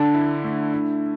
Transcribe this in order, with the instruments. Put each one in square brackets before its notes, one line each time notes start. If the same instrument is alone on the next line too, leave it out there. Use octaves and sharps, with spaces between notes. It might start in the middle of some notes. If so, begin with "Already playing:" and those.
Already playing: [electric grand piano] D3 [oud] D4
[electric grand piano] E4
A3
E4